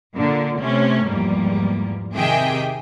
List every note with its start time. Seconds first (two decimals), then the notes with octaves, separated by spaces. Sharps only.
0.15 A#2 D3 A#3
0.60 C3 A3 C#4
1.05 E2 G#2 F3 G3 A#3
2.13 C3 D#3 G4 G#4 E5 G5